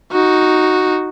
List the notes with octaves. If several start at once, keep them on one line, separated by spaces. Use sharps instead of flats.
D#4 F#4